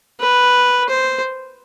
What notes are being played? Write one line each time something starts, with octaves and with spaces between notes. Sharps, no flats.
B4
C5